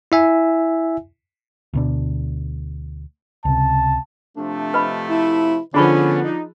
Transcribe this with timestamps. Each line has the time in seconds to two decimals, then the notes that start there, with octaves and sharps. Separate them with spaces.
0.12 E4 E5 G#5
1.74 D2 B2 D4
3.45 C#2 C3 A5
4.36 C3 F3 A3 D4
4.74 B4 D#5 B5
5.08 E4
5.74 D3 F3 B3 C#4 D4 G#4 B5 C#6
6.23 D#4